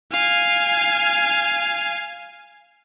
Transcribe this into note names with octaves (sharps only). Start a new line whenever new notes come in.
F5 G#5